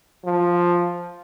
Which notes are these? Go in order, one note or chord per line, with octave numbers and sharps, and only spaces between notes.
F3